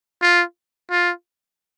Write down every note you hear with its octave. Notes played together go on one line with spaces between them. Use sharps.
F4
F4